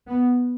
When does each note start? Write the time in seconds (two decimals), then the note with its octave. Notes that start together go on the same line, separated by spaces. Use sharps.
0.09 B3